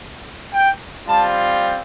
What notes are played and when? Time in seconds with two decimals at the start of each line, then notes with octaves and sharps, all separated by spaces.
0.53 G5
1.07 G3 C4 F4 A5